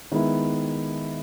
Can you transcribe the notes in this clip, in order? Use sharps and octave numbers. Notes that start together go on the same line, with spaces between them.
D#3 G#3 B3 E4